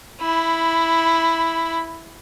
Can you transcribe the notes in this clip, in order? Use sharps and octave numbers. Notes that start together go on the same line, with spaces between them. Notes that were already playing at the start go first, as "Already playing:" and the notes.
E4 B5